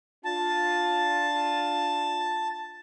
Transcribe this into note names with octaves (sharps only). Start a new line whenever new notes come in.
D4 F4 A5